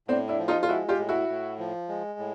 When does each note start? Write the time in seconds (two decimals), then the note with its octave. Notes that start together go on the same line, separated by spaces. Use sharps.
0.08 A2 C4 D4
0.28 D4 E4
0.39 F3
0.48 D#4 F4
0.63 F4
0.69 G#3 E4 F#4
0.89 F4 G4
0.98 A2
1.09 E4 F#4
1.29 A2
1.59 F3
1.89 G#3
2.19 A2